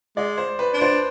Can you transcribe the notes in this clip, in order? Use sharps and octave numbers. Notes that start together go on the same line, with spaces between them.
G#3 D5
C5
B4
D4
C5